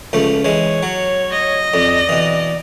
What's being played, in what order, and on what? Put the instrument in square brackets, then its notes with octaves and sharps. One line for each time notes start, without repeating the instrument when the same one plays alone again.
[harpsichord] C#2 F3 A3
[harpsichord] E3 G#3 [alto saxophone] C#5
[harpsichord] F#3
[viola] D#5
[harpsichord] F2 [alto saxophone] D5
[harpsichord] B2 E3